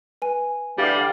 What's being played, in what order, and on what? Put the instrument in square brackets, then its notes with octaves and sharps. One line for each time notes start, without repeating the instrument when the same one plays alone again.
[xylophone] B4 G#5
[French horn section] D3 E3 A3 [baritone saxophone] G3 [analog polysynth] G4 F5